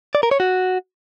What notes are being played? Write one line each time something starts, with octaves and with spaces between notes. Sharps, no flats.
D5
A#4
C#5
F#4